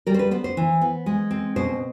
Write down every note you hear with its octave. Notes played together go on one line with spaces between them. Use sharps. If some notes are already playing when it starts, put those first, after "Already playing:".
G3 A#4
C5
B4
B3 C5
C5
E3
B3
G#3
C4
B2 C5